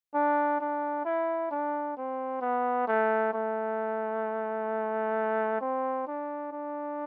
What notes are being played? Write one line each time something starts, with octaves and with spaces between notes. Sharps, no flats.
D4
D4
E4
D4
C4
B3
A3
A3
C4
D4
D4